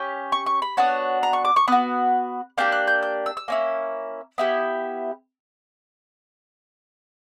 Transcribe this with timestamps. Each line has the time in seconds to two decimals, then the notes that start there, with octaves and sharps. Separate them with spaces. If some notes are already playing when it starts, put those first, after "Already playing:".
Already playing: C#4 G4
0.32 C#6
0.46 C#6
0.62 B5
0.77 B3 D4 F#4 C#5
1.23 A#5
1.33 C#6
1.45 D6
1.56 C#6
1.68 B3 F#4 F#6
2.58 A#3 D4 G4 G6
2.72 F#6
2.87 G6
3.02 G6
3.26 E6
3.37 E6
3.48 A#3 C#4 E4
4.38 B3 E4 G4